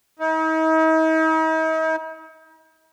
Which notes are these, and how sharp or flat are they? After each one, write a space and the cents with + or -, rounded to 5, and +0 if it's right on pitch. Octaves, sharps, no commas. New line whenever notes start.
D#4 +45